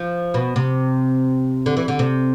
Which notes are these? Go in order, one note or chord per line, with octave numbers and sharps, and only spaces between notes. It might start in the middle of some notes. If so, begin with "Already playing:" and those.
Already playing: F3
B2
C3
D3
E3
D3
C3